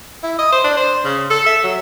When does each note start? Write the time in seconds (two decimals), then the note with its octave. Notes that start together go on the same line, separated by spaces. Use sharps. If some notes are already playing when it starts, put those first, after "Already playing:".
0.23 E4
0.39 D#5
0.52 C5
0.64 D4
0.77 C5
1.04 C#3
1.30 A4
1.47 E5
1.63 F#3